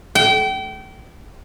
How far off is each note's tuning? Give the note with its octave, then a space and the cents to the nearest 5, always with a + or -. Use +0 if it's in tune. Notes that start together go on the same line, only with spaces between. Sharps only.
G5 -30